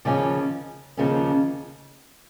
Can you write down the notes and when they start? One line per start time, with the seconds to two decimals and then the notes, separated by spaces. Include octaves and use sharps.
0.05 D#2 C#3 F3 A#3 C#4
0.97 D#2 C#3 F3 A#3 C#4